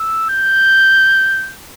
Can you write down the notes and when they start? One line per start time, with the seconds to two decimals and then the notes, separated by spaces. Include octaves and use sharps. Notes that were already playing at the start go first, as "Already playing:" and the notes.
Already playing: E6
0.30 G6